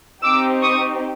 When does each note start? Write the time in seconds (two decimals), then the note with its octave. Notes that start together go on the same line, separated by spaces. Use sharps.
0.23 C4 D#4 G4 D6 E6
0.62 C#6 D#6